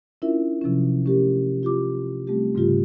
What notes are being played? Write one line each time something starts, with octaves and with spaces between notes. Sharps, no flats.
C#4 D4 E4 F4 A#4 E5
C3 F3 F#3 C#4
A3 C#4 G4 A#4
F4 G4 D6
G3 A3 C4 G4
G#2 C#3 G3 F4 G4